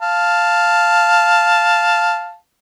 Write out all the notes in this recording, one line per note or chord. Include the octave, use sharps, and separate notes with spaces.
F5 A5